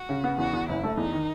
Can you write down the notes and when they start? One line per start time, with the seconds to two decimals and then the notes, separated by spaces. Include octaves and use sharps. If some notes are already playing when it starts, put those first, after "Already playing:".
Already playing: F#4
0.09 C#3
0.24 B3
0.38 E2 F#4
0.53 E2
0.68 F#1 E4
0.83 A3
0.97 E2 D#4
1.13 D#3